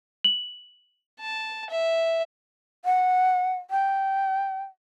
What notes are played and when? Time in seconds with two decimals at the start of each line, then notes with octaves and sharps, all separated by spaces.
0.24 F#7
1.21 A5
1.70 E5
2.85 F#5
3.71 G5